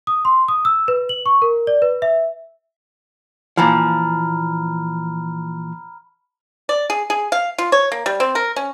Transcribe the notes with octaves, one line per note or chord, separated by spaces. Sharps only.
D#6
C6
D#6
E6
B4
F#7
C#6
A#4
D5
B4
E5
A#2 E3 F3 A#5 B5 F6
D5
G#4
G#4
F5
F4
C#5
A#3
G3
C4
A#4
C#4